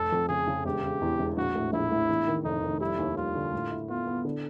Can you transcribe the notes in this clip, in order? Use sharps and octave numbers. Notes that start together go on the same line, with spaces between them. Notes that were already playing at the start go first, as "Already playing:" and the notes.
Already playing: F1 A4
F2
C#3 G#4
C#3
E1 G4
C#3
E2
E1
A#1 F#4
A2
A#1 E4
A2
E2
D#3
F1 D#4
D#3
G3 E4
D#2
G3 F4
D3
A2
E4
B3 F4
B3
D3